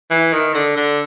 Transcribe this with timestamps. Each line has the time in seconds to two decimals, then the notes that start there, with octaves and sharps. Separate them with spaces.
0.11 E3
0.33 D#3
0.54 D3
0.76 D3